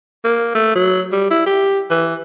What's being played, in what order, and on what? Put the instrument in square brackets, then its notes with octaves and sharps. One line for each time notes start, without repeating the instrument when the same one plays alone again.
[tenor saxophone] A#3
A3
F#3
G3
E4
G4
E3